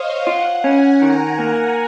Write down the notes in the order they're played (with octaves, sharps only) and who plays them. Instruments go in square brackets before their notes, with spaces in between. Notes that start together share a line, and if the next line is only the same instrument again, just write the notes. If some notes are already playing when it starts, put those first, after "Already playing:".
Already playing: [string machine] C5 C#5 D#5 F5
[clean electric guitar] F4 [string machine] F#5
[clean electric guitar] C#4 [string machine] G#5
[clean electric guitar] D#3 [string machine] A#5
[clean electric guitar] A#3